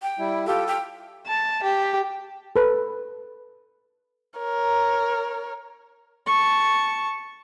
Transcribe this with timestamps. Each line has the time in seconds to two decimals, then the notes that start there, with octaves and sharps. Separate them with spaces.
0.02 G5
0.19 G3 E4
0.47 F4 G4 A4
0.67 G5
1.27 A5
1.64 G4
2.56 A4 B4
4.39 A#4 C#5
6.26 A5 C#6